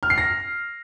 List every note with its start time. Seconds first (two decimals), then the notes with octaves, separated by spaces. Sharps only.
0.03 F6
0.10 C7
0.18 A#6